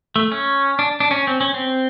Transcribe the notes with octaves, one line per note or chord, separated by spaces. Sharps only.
A3
C#4
D4
D4
C#4
C4
C#4
C4